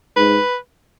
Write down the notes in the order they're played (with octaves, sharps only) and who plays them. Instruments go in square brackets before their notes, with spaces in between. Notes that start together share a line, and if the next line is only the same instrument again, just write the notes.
[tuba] G#2 [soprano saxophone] B4